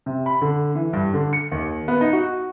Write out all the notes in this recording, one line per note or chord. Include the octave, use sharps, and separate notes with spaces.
C3
B5
D3
E3
G2
D3
C#7
D#2
B3
D#4
F#4